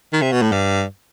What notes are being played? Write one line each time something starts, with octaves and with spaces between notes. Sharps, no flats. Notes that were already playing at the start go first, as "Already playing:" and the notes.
D#3
C3
B2
A2
G2